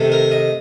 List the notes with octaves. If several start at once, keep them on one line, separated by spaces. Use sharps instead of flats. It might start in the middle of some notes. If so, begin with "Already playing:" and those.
Already playing: C3 D#3 A3
A#4
D#5